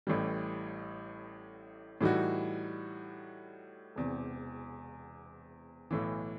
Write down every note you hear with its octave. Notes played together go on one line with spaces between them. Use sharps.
A1 A2 E3 G3
A2 E3 G3 D#4 F#4
E1 E2 C3
B1 A2 E3